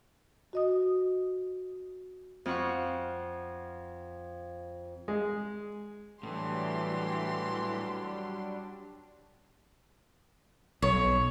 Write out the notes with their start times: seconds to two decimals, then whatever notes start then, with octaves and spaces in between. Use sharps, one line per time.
0.53 F#4 D#5 D#6
2.46 F2 F5 F#5 C#6 F#6
5.08 G#3
6.23 A2 E3 F#3 G3 D4 G4 C6
10.82 B1 C#5